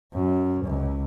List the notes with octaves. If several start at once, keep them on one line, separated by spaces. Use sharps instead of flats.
F#2
C#2